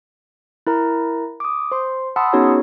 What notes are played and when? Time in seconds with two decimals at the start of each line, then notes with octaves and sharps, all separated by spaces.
0.67 E4 A#4 A#5
1.40 D6 D#6
1.72 C5 C6
2.16 F#5 A5 B5 C6 D#6 E6
2.33 B3 C#4 D#4 F#4 G#4 C#5